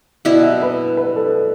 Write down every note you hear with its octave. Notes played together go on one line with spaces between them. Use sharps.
B2 B3 E4 D5
E5
B4
B4
A4